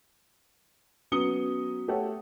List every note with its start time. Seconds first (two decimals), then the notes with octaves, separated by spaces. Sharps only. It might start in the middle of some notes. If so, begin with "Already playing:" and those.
1.12 F#3 B3 C#4 D#6 C#7 G7
1.88 A3 G4 A4 C#5 F#5